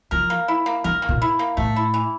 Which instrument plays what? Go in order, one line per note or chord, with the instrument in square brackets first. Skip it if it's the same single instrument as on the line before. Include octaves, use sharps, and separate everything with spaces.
[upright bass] F3 [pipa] A#4
[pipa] A#3
E4
A#3
[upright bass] F3 [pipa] A#4
[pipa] A#3
[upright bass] A#2
[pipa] E4
A#3
[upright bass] A2 [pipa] A3
[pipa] E4
E3